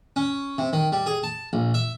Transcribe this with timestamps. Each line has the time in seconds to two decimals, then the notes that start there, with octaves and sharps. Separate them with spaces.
0.16 C#4
0.58 C3
0.73 D#3
0.92 G3
1.06 G#4
1.23 A5
1.53 A#1
1.74 E5